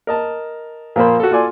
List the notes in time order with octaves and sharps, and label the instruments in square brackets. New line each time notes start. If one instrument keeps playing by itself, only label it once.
[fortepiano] A#4 D#5 A5
A#2 F3 A#3 A#4 C5 B5
F#4 A4
F4 A4 D5 G#5 C6